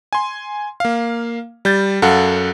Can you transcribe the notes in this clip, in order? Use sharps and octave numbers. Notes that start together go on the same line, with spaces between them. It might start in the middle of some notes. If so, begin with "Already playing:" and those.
G#5 C6
A#3 F5
G3 G6 A6
F#2 A4 F5 F#5